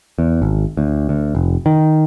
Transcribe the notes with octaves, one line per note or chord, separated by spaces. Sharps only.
E2
G#1
D2
D2
F1
D#3